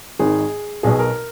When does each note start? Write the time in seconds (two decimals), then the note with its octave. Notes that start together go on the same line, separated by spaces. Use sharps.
0.19 G#1 G#2 D#3 G#4
0.83 B1 B2 G#4
0.99 A#4